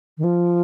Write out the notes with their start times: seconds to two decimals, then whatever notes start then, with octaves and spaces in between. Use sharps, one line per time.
0.18 D#3
0.24 F3